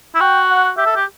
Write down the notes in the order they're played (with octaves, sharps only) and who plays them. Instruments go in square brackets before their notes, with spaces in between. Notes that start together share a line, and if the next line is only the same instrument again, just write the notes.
[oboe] E4
[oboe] F#4 [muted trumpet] G5
[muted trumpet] F#5
[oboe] G4 [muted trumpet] E5
[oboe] A4
G4